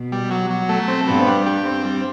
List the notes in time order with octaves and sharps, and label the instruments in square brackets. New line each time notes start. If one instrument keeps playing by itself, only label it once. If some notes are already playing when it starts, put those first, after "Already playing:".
Already playing: [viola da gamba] B2
[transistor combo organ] G3
F#3
F#3
A3
C4
[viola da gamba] G2 [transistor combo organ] B3
[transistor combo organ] G3
G4
C4
G3